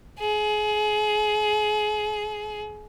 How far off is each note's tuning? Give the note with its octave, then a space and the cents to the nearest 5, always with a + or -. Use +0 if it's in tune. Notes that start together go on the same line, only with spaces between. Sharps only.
G#4 +30